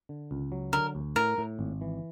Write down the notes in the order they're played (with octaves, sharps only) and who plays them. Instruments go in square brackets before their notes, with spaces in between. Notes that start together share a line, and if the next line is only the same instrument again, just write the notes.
[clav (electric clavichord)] D3
C#2
F#3
[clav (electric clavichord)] D3 [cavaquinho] A#4
[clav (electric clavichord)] D2
[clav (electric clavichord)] A2 [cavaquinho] A#4
[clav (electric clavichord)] A2
G#1
E3